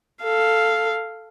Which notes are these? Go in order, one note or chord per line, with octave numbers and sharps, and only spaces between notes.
A4 F5